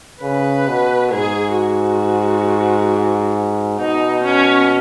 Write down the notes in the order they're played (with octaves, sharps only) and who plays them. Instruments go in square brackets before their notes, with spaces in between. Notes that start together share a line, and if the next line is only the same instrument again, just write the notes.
[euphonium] C#3 [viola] B4
[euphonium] B2
[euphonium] G#2 [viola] G#4
[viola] F#4
[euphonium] B2 [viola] D#4
[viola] C#4